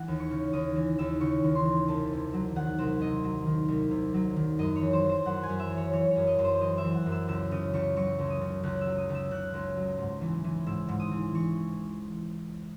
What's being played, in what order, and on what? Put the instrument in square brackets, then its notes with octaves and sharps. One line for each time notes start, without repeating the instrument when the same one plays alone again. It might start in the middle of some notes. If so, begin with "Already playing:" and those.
Already playing: [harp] E3 F#5
D#2
C#6
C#3
D#2 D#6
E3
D#2 E6
C#3 C#6
D#2
C6
E3
C2 A5
C3
F#3
D#3 F#5
C2 C5
C3 D#5
F#3
D#3
C2
C3
F#3
D#3
F#2 D#5
C#5
E3
C5
E3
C5
F#2 F#5
G#5
F#2
E5
E3
C#5
E3 C#5
C#5
F#2
D#5
F#2
C5
E3 D#5
E5
E3
F#5
F#2
E6
C#2 E6
C#3 D#6
C#2 C#6
F#3 C#6
C#2
D#6
C#3
C#2 F#6
F#3 E6
D#6
C#2
E6
C#3 F#6
C#2
F#3
G#2
E3
E3
G#2 E6
G#2
D#6
E3
E3 C#6